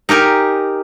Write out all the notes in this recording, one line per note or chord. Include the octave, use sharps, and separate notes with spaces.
D#4 G4 A#4 G#5